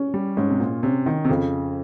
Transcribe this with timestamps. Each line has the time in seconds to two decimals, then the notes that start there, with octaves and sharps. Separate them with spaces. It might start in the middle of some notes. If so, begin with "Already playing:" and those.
Already playing: C#4
0.14 G3
0.37 G#2 C#4
0.50 C3
0.60 A#2
0.83 C3 C#4
1.06 D#3
1.25 C3
1.29 F2 C#3